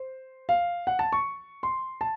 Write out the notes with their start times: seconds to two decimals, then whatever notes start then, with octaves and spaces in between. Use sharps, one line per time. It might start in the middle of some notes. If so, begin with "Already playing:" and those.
Already playing: C5
0.49 F5
0.87 F#5
0.99 A5
1.12 C#6
1.63 C6
2.01 A5